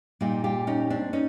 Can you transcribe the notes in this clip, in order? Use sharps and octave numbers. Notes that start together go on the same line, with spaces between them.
A#2 G3 D#4 F4
F4 G4
C#4 D#4
C4 D4
C#4 D#4